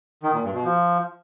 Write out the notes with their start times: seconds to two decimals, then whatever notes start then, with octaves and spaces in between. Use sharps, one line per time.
0.23 D#3
0.33 A#2
0.44 G2
0.54 B2
0.64 F3